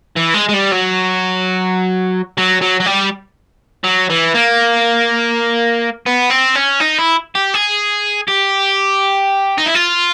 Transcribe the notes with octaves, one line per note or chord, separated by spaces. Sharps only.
E3
G#3
G#3
G3
F#3
F#3
F#3
F#3
G3
F#3
E3
A#3
B3
C4
C#4
D#4
E4
G4
G#4
G4
D#4
E4
F4